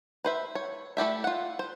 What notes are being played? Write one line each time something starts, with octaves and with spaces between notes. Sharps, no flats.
B4 C5 E5
C#5
A3 E4 G4 E5
F4 F#5
C5